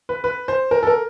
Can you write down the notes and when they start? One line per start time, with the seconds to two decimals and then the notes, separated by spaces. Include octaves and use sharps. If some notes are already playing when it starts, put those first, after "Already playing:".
0.09 B4
0.24 B4
0.48 C5
0.71 A#4
0.83 A4
0.87 A#4